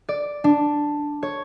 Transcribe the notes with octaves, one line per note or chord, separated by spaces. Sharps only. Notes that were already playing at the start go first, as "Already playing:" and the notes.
D5
D4
C#5